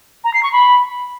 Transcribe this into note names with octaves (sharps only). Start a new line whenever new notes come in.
A#5
C7
C#6
B5